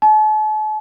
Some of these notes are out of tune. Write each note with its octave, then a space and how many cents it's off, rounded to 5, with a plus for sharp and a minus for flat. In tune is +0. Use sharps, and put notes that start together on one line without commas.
A5 -45